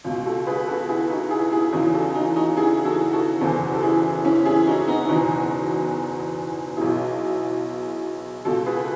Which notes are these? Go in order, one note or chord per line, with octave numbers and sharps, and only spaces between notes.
C#2 B2
F#4 A4
G#4 B4
F#4 A4
E4 G#4
D#4 F#4
E4 G#4
E4 G#4
E2 C#3 E3 D#4 F#4
F#4 A4
D#4 F#4
D#4 F#4
E4 G#4
F#4 A4
F#4 A4
F#1 E2 B2 F#4 A4
A4
E4 G#4
C#4 E4
E4 G#4
D#4 F#4
B3 D#4
F#1 E2 B2 D#4 F#4
B1 B2 E4 G#4
C#2 B2 F#4 A4
G#4 B4